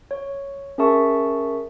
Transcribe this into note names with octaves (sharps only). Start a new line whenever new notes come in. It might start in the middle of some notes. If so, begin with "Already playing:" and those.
C#5
C#4 G#4 A#4 E5 A5 C#6